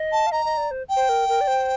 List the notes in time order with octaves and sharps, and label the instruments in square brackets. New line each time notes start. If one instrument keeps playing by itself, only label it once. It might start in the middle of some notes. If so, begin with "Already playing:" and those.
Already playing: [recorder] D#5
[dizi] A5
[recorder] F5
[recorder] D#5 [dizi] A#5
[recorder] D#5
D5
C5
[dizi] G5
[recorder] C5
A#4
A#4
D5
C5